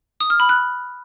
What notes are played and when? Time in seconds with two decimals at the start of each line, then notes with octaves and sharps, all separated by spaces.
0.21 D#6
0.30 F6
0.40 B5
0.49 F#6